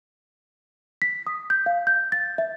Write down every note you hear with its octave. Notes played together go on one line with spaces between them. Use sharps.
B6
D#6
G6
F5
G6
A6
E5